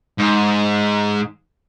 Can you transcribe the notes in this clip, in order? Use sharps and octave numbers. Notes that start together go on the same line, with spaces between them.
G#2